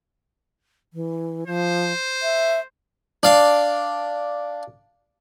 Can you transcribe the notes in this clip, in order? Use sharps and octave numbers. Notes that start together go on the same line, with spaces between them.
E3
F3 C5
E5
D4 F5